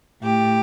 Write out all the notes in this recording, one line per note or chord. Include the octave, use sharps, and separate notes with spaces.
A2 G4